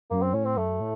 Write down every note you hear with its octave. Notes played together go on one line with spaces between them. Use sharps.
F#2 A#3
C4
A2 C#4
C4
F#2 A3
A2